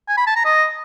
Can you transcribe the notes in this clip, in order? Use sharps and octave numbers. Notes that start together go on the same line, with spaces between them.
G#5
B5
A5
A#5
D#5